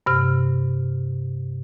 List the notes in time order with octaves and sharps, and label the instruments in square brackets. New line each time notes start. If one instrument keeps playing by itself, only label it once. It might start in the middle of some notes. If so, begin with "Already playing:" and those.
[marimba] G2 C3 F6